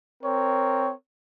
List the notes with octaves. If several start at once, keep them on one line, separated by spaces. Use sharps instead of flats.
C4 A#4 C#5